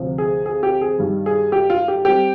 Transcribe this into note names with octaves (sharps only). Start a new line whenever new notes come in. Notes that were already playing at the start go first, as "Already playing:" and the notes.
Already playing: D2 C3 F3
G#4
G#4
G4
G#4
G2 D#3 G3
G#4
G4
F4
G4
G3 C4 G4